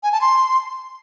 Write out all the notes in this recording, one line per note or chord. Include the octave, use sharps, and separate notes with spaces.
G#5
A5
C6